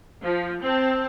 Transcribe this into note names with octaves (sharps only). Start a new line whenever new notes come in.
F3
C4 A5